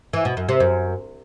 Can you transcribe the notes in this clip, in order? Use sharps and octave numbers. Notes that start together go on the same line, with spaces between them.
E3
B2
F#2
C3
F#2